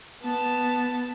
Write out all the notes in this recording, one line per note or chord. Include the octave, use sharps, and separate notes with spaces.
B3 A5